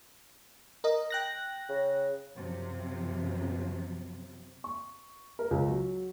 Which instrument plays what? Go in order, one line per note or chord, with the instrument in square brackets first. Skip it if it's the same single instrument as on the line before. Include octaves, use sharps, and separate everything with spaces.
[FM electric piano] A#4 D#5
G5 F#6 A#6
[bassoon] C#3
[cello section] F#2 C3 F3
[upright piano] C#6
A#4
C#2
F#3